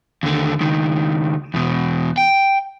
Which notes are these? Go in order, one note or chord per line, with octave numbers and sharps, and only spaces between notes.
D#2 D3
C#2 D#3
E2 B2
G5